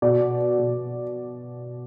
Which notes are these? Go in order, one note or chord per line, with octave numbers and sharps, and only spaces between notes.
B2 D5
B2